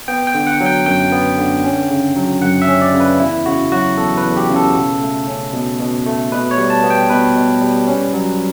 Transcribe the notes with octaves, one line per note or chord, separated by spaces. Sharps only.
B3 G5
G5
D3
F#5
F#3
G5
F#2 G5
B3
D3
C#4
C#3
F#3
F#2 F#5
E5
C#4
D5
C#3
B4
E2 E4
C#3 F#4
F#3 F#4
E2 A4
B4
E2
G4
C#3
A4
B2
A3
C#4
B2
B2
A3
B2 B4
C#5
G3
A5
B3
G5
B2 B4
B2
G3
C#4
F#3